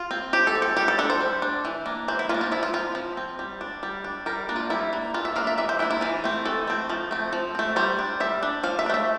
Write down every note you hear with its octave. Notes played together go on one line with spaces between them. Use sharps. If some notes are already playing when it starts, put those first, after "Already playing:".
Already playing: F4
C4
F3 G4
A4
C4
A4
G3 G4
A4
D4 A4
C5
G3
D4
E3
A#3 D4
E3 C5
E4
A#3 D4 F4
F4
F3 E4
F4
C4 F4
F3
C4
G3
D4
G3
D4
G3 A#4
A#3 D4
F4
G3 E4
A#3 D4
E3 F4
E5
A#3 D4 F5
E5
E3 E5
C5
A#3 D4 E4
E4
E3 F4
A3 C4
E3 A4
A3 C4
F3
A3 C4
F3
A3 C4
G3 C5
D4
G3 E5
D4
F3 F5
E5
D4
A3 E5